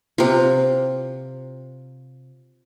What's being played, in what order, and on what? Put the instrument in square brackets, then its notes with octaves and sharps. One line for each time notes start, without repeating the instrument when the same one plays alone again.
[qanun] C3 F4